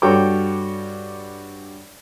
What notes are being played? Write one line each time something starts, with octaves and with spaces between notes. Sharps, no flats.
G2 F#4 A4 C#5 G5 D6